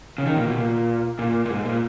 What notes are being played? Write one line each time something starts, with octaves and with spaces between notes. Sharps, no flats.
C#3
D#3
A#2
B2
A#2
A#2
A#2
G#2
A#2